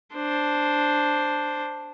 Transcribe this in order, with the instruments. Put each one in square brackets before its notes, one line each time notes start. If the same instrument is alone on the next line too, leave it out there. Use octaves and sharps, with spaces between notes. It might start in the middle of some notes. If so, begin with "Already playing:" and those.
[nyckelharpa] D4 C5